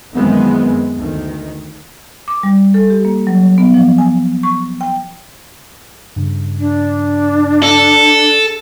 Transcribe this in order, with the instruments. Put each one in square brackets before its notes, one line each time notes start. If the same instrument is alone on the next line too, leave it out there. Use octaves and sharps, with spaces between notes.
[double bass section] F#2 D#3 E3 G#3 B3 C4
D2 D#3
[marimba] D6
G3
A4
G4
A#3
F#3
B3
F3
G#5
C#6
G5
[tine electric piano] G2 C#3
[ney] D4
[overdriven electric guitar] A4